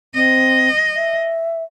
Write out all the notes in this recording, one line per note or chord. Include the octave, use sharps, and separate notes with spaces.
C4 D#5
E5